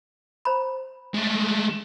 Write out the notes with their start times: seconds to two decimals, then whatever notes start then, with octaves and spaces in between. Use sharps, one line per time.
0.45 C5 A#5 B5
1.14 G#3 A3